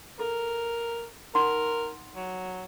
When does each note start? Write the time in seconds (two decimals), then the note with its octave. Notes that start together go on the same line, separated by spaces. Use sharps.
0.19 A4 A#4
1.35 D#4 A#4 F#5 C6
2.16 F#3